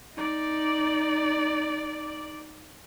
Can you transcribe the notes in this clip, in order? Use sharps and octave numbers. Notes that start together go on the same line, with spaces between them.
D#4 D5